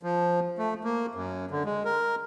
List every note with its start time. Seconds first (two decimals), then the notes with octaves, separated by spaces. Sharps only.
0.03 F3
0.58 A3
0.84 A#3
1.15 F#2
1.51 D3
1.65 G#3
1.85 A#4